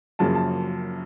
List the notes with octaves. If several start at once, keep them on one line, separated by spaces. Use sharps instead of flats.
F#2 C#3 F3 A#3 A5
A5